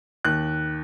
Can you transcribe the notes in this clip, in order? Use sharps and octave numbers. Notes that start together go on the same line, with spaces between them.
D#2 F#6